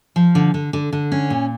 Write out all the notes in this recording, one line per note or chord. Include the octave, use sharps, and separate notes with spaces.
F3
D3
D3
D3
D3
C#4
A#2